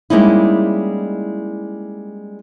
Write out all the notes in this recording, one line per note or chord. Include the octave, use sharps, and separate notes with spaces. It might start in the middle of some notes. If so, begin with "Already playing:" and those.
G3 G#3 A#3 C#4 D#4 E4